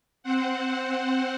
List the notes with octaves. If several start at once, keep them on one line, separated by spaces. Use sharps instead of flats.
C4 C5 F#5